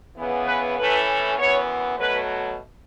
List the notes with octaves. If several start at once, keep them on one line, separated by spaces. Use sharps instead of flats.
C#3 E3 B3
B4
A2 E3 A3 C#4 B4
F#2 E3 B3 C#5
B2 F#3 A3 B4